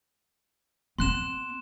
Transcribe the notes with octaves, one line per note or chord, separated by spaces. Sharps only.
B3 C4 C6 F#6 E7